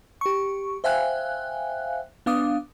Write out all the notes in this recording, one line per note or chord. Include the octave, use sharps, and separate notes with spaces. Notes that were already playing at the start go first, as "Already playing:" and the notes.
G4 C#6
C5 E5 F5 G5 G#5 F#6
B3 D4 F5 D6 D#6